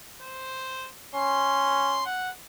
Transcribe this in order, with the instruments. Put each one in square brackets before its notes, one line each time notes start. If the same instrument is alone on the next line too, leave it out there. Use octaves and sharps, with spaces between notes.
[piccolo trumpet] C5
[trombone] C#4 [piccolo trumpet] C6
[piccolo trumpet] F#5